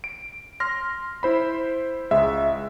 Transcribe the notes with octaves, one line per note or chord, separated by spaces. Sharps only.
D7
C6 F6 A#6
E4 C5 B5
C#2 G#3 E5